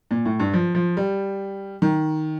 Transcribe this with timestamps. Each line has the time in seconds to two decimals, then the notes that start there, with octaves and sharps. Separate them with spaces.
0.11 A#2
0.25 A2
0.40 G2
0.54 F3
0.75 F3
0.97 G3
1.82 D#3